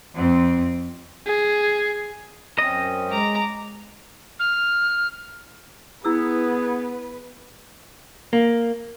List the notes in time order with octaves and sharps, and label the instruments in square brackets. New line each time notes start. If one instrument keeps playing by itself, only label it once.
[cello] F2 C4
[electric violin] G#4
[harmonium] F#2 C4 C#4 [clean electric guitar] D#5
[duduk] G#3 [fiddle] A#5 D6
[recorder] F6
[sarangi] B3 [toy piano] E4 E6 [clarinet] G#4 [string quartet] B4
[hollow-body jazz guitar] A#3